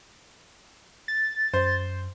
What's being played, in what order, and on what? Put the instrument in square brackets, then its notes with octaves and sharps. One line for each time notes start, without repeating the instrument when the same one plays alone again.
[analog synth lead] A6
[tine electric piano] F#2 [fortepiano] C5